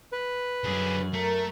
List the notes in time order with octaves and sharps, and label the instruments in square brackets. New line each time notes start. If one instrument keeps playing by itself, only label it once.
[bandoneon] B4
[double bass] F#2 [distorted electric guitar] D3 G#4
[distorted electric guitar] A3 [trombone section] A#4